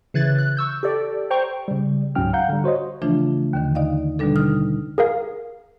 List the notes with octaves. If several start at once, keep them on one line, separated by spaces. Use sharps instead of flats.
C#3 E3 F#6 G#6 A6
F#6
C#6 E6 G6
G4 A4 D5
C5 G5 A#5 C#6
C#3 G3
C#2 G#2 F#3 C#4 G5 F6
F5 F#5 A#5 G6
D3 G3
F#4 C5 C#5 D#5
C#3 E3 F3 A3 D4 F4
D#2 D3 D#3
D#4 D5 D#5 F5
B2 D3 D#3 G3 D4 A4
D#4 D#6 F6
G#4 A#4 F5